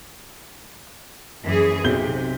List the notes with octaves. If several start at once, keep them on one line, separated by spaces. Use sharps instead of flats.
F#2 E3 G#4
B1 C3 G6 G7